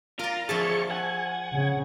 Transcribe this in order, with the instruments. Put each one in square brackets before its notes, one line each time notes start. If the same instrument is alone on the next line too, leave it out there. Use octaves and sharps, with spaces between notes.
[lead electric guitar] F4 [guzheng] A#4 D5 [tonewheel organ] A#5
[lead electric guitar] A#2 D3 [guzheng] F3 E5 A5 [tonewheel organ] G#4 C#6
[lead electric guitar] F#5 [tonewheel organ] G#5
[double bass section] C#3